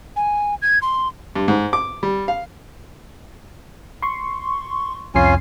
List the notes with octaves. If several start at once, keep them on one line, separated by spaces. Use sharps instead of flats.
G#5
G#6
C6
G2
G#2
D6
G3
F5
C6 C#6
C2 F2 C#4 F4 G#5 C7